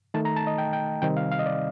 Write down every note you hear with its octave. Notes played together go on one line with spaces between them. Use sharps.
D#3 A3 D#4 A5
A#5
A5
D#5
G5
G5
C3 D#3 G3 C4 D#4 G5
F5
F5
D#5
D5